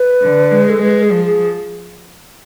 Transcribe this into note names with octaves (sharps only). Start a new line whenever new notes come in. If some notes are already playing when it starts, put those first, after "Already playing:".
Already playing: B4
D3
G#3
A4
G#3 B4
G#4
F3
G#4